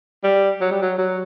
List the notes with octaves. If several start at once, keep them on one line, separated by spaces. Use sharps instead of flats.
G3
F#3
G3
F#3
F#3